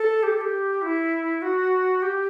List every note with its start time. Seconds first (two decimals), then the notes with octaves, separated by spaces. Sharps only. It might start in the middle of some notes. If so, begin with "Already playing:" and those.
Already playing: A4
0.23 G4
0.32 A4
0.41 G4
0.82 E4
1.42 F#4
2.02 G4